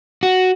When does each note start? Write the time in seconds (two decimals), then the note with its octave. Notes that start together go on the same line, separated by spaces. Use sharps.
0.23 F#4